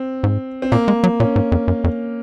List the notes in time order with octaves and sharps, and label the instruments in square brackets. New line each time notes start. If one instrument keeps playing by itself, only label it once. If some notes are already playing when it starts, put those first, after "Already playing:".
Already playing: [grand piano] C4
[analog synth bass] G#2
[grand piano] C4
[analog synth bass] A#2 [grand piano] A#3
[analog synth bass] G#3
F#3
[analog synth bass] A#2 [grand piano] C#4
[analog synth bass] G#2
F2
F#2
F2